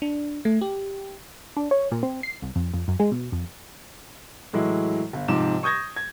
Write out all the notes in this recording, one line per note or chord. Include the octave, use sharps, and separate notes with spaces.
D4
A3
G4
D4
C#5
A#2
C4
C7
C2
F2
F2
F#2
G#3
B2
F2
A2 E3 F#3 G#3 E4
G1
G#2 C3 F3 D6 E7
C#6 D#6 G6 G#6 A#6
G#6